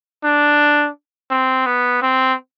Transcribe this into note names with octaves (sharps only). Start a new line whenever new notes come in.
D4
C4
B3
C4